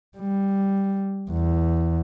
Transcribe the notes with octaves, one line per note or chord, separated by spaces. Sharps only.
G3
E2